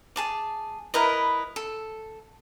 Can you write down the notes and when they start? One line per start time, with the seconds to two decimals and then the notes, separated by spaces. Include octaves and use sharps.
0.16 G#4 A5 D6
0.94 E4 A#4 B4 D#5
1.56 A4